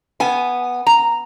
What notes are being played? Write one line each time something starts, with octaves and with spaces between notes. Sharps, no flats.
B3 G#5
A#5